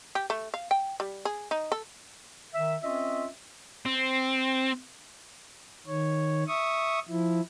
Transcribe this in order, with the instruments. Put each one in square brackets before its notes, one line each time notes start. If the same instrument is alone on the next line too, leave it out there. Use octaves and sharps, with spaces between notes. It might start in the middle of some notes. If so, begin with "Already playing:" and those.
[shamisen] G4
A3
F5
G5
G3
G#4
D#4
A4
[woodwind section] D#3 E5
C4 C#4 F4 D#5 E5
[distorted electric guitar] C4
[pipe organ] D#3 C#5
E5 C#6 D#6
F3 E4